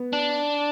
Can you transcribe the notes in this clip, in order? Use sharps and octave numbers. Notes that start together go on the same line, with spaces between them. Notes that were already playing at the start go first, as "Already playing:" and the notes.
Already playing: B3
D4